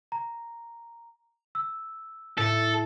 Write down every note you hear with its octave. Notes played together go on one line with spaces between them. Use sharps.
A#5
E6
A2 A4